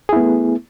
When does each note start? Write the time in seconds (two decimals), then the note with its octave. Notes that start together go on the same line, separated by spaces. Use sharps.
0.09 G#4
0.13 E4
0.16 B3
0.20 A3